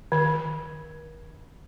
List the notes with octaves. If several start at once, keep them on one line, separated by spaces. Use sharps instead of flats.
D#3